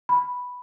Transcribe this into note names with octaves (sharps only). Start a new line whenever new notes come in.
B5